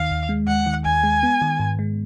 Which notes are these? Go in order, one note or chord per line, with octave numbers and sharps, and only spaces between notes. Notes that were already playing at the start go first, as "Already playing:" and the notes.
Already playing: D#2 D#3 F5
D#2
G#3
D#2 F#5
D#3
D#2 G#5
G#3
B3
D#3
G#2
G#3